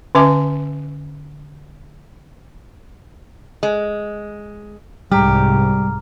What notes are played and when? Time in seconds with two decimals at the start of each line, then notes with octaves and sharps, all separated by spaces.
0.15 D3 C#4 B4 E5 G#5 D6
3.63 G#3
5.12 C2 G#2 G3 G4 A#5 F6